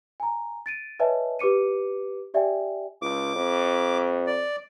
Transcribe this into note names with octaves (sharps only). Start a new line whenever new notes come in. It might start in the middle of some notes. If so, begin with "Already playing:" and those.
G#5 A#5
A6 D7 D#7
B4 C#5 D#5 E5 G#5 A5
G4 B4 D6 C#7 D#7
G4 D5 E5 G5 G#5
C#2 D6
F2
D5